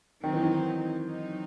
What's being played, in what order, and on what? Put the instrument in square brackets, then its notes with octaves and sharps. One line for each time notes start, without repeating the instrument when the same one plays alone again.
[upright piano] D#3 [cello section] F#3 C4 D#4
[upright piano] E3
D#3
[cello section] F#3 C4 D#4